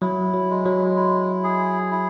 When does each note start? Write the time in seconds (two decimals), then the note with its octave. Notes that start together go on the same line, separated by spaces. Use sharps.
0.02 F#3 E4
0.34 F#3
0.50 G#3
0.65 F#3
0.96 E4
1.44 G#4
1.92 E4